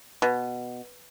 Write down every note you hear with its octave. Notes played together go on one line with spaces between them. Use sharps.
B2